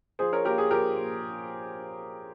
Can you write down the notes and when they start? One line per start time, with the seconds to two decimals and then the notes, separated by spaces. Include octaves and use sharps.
0.19 F3 G#4 C5
0.32 A#4 C#5
0.45 A#3 G4 A#4
0.58 G#4
0.71 F3 G4 A#4
0.97 A#2